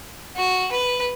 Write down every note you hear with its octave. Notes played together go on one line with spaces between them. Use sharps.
F#4
B4